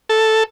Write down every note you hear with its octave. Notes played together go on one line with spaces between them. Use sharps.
A4